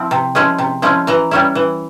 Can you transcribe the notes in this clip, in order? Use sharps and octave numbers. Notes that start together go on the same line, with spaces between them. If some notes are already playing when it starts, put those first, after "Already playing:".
Already playing: F3 C4 E4
C3
F3 G#3 C#4 E4
C3
F3 G#3 C#4 E4
E3 A#5
G3 C#4 E4
E3